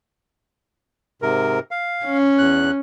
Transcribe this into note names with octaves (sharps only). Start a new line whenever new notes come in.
G#2 C3 A#4
F5
C#4
E2 F#6